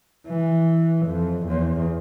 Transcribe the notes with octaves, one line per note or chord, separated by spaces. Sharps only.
E3
F2
E2